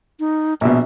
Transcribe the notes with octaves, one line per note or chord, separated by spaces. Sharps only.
D#4
A#1 B2 E5